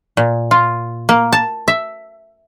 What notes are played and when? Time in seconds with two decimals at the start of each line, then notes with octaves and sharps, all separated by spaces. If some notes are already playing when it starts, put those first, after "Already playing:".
0.17 A#2
0.51 F4
1.09 A#3
1.32 A5
1.68 E5